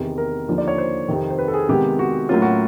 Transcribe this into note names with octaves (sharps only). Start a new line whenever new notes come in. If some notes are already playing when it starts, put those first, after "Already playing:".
Already playing: E2 C3 D#3
A#4
D#2 D3 F3
D5
C#5
C5
F2 C3 D#3
C5
B4
A4
G#4
C3 D#3 G#3 B3 G4
F#4
A2 F#3 A#3 C#4 F4
F#4